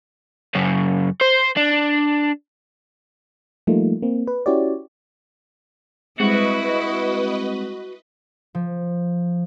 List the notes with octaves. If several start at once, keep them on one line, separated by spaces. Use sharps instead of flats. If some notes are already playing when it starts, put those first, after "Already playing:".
F#2 C#3
C5
D4
F3 G3 A3 A#3 D#4 F4
A#3 C4
B4
C#4 E4 F#4 G4 C#5 D5
G3 G#3 C4 E4 F#4 B4 D#5
F3